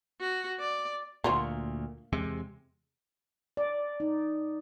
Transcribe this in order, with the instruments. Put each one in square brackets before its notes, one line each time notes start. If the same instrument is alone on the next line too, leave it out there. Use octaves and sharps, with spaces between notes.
[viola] F#4
D5
[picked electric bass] D2 A#2 [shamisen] A#3 F4 F#4
[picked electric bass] E2 C3 G#3
[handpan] D5
D#4